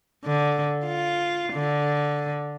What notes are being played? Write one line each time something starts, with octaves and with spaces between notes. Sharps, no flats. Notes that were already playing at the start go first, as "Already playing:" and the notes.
D3
F4
D3